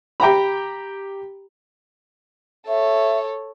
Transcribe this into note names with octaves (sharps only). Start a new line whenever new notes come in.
G4 G5 A#5 B5
A4 C#5 E5